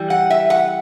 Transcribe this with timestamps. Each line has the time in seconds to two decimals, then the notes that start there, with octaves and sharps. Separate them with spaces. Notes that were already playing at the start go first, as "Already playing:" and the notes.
Already playing: E3 G3
0.10 F#5
0.30 E5
0.50 F#5